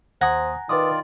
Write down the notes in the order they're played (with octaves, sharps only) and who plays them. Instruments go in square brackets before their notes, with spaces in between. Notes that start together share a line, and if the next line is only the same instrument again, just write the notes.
[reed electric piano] D#2 D#6 [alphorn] C5 [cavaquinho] F#5 G#5 A#5
[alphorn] D#3 [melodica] F4 D5 [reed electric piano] B4 D6 D#6